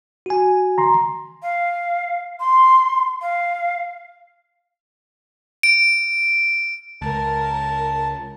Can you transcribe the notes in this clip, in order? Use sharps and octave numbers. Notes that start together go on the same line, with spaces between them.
F#4 G#5
A#5 C6
F5
C6
F5
D7
C#2 A#4 A5